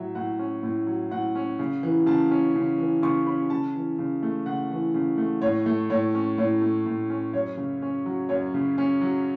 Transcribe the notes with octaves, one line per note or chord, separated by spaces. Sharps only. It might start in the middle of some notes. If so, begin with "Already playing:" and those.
Already playing: A2 F#3 E5
A2 F#5
C#4
A2
F#3
A2 F#5
C#4
C#3
E3
C#3 A5
C#4
C#3
E3
C#3 C#6
C#4 B5
C#3 A5
E3
C#3
A3
C#3 F#5
E3
C#3
A3
A2 C#5
A3
A2 C#5
C#4
A2 C#5
A3
A2
C#4
F#2 C#5
C#3
C#4
F#3
F#2 C#5
C#3
C#4
F#3